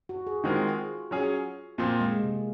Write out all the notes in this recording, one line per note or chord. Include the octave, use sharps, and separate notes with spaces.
F#4
G#4
D#3 G#3 C4 F4 F#4 A#4
F#3 C#4 G#4
A#2 F3 A#3 C4
G#3
C3